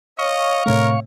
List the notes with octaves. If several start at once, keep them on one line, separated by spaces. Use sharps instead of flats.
C#5 D#5 F5 C#6
A2 C3 A3 A#4 C#5